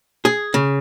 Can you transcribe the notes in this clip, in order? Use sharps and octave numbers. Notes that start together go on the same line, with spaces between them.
G#4
C#3